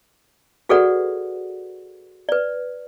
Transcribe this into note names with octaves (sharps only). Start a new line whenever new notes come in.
F#4 G#4 A4 B4 D5 F#5
B4 D5